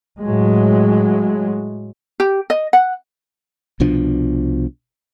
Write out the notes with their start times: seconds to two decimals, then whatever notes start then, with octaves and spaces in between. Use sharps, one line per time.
0.21 A2 F#3 G#3
2.20 G4
2.50 D#5
2.73 F#5
3.80 C2 B2 F3 D4